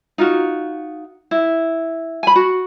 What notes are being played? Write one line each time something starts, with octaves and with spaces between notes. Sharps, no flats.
D#4 F4 F#4
E4
G#5 B5
F#4